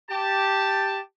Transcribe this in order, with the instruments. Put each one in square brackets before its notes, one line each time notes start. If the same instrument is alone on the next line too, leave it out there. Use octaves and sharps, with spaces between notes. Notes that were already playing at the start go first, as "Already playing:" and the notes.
[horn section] G4 A5